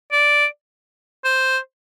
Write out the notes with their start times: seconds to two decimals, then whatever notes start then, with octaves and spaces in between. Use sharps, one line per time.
0.12 D5
1.24 C5